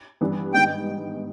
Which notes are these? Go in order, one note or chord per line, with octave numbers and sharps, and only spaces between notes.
G2 E3 G3 B3 D4
G#2 D#3 G3 B3 G5